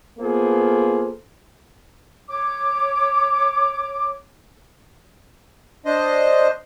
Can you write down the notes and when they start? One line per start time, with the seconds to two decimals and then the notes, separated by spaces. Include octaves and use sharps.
0.19 A#3 B3 F4 G#4 A4 C5
2.28 C#5 D6
5.85 D4 C5 D#5